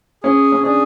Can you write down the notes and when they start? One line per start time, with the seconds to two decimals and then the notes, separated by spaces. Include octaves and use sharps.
0.23 C#4 G#4
0.52 C#4
0.64 D4 G#4